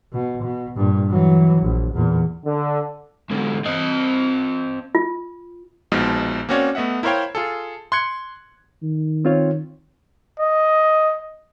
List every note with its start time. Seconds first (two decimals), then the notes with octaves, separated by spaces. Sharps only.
0.13 B2
0.43 B2
0.76 G2 A#2
1.10 E3 F#3
1.62 A#1
1.94 E2 A#2
2.44 D3
3.30 G#2 D3
3.65 C4 D#5
4.95 F4
5.92 A#1 B2 F3 G#3 D#4
6.49 A#3 C4 C#4 F#4 C#5 D5
6.75 A3 B3 D#5 E5 F#5
7.03 E4 A#4 C5 C#5 F5 G5
7.35 F4 G#4 A4
7.92 C6 F#6 G#6 C#7
8.83 D#3
9.25 C4 F4 C#5
10.40 D#5